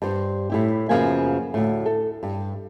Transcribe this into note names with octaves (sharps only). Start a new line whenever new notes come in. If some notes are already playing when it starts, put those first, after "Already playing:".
G2 C5
A2 E4 G4
F#2 C#3 F3 A#3 B3 G#5
D2 A2
A4
G2